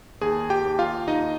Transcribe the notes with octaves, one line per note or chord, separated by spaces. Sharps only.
D#2 G#4 G#5
G4 G5
D#2
F4 F5
D#2 D#4 D#5